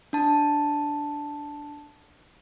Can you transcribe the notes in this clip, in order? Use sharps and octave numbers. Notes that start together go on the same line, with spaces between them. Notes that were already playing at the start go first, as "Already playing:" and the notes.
D4 A5